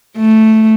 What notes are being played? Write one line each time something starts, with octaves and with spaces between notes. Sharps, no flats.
A3